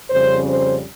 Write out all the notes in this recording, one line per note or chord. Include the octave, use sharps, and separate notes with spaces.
F2 C#3 G3 C#4 C5
C5